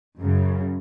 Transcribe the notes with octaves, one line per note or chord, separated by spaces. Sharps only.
F#2 C#3